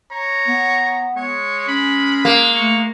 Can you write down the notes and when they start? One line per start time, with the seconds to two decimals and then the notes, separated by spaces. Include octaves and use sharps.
0.12 C#5 A#5
0.48 B3
1.16 G#3 C#5
1.68 C#4 B5
2.25 A#3
2.55 A3 C#6